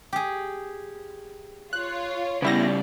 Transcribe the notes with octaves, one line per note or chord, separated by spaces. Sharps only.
G4 G#4
F4 C#5 F#6
C#3 G3 B3 E4 D5 A#6